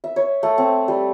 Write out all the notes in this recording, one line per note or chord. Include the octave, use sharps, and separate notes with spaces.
E5
C#5
A3
C4
G3